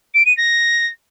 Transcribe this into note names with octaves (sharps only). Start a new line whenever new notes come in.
D7
D#7
A#6